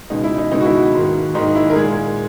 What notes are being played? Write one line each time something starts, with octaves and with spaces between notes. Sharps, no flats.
C#2 B2 G#3 D#4
E4
D#4
C#2 B2 G#3 D#4
F#4
E4
F#4
G#2 D#3 A#3
G#2 D#3 A#3 D#4
E4
A#4
A#2 G#3 G#4